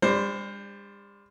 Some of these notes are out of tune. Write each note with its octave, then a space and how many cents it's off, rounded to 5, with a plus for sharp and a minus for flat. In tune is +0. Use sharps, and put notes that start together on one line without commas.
G3 +45 D4 +0 C5 +10